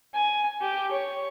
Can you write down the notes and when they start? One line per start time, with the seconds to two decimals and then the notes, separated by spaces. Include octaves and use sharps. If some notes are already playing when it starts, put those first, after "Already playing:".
0.14 G#5
0.61 G4
0.91 C#5